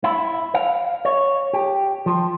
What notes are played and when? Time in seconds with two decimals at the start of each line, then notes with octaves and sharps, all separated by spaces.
0.04 E4
0.54 F5
1.05 C#5
1.53 G4
2.06 F3